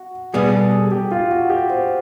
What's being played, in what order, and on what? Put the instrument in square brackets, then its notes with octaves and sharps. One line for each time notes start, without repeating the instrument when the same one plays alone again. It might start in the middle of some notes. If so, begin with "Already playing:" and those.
Already playing: [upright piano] F#4
[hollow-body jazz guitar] B2 G3 B3 [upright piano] G#4
[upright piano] A4
G#4
G4
F4
F#4
G4
C5